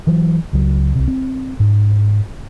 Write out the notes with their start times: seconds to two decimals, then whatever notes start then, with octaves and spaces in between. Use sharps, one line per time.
0.07 E3 F#3
0.53 C#2 F#3
0.95 C2 C3
1.08 C4
1.60 G#2